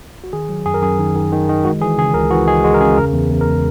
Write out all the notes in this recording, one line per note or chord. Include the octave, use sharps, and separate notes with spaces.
F#4
D#3 G#4
F#3
F#2 G#4
A#4
F#2 G#4
D#3
D#3
D#3
D#3
G#3 F#4
E3 G#4
C#3 G#4
C#2 A#4
E3 F#4
G#3 G#4
G#3 F#4
A#4
C#3 G#4
E2 A#4
E2
E2
A#4
G#3